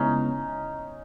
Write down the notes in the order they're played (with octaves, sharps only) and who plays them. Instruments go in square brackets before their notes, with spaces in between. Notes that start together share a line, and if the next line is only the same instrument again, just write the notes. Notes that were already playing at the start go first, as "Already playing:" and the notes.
Already playing: [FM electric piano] C#3 G#3 B3 E4 [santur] C#4 D#4